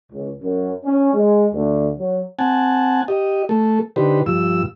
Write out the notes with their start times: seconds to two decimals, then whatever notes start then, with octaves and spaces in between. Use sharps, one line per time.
0.11 C#2
0.42 F#2
0.84 C#4
1.13 G#3
1.52 D2
1.97 F#3
2.39 C4 F#5 G#5 A5
3.08 G4 D#5
3.49 A3 A4
3.96 D3 D#4 G4 B4 C5
4.26 G2 F3 E6